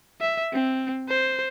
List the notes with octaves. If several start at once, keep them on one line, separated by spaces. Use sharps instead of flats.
E5
C4
C5